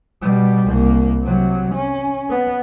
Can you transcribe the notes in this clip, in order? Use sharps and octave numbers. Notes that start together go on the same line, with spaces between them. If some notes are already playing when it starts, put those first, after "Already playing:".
B2 G3
C2 A#3
C3 F#3
C#4
B3